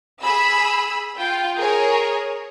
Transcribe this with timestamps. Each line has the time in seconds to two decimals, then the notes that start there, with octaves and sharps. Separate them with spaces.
0.22 G#4 B5 E6
1.18 F4 G5
1.58 G#4 A#4 C#5